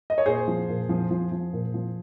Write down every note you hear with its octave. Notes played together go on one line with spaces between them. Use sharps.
D#5
C#5
A#2 G#4 C5
F3
A#2
F3
F3
F3
A#2
F3